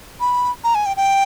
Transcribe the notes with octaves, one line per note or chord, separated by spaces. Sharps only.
B5
A#5
G#5
G5
G5